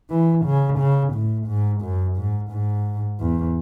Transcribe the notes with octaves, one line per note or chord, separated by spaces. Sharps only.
E3
C#3
C#3
A2
G#2
F#2
G#2
G#2
E2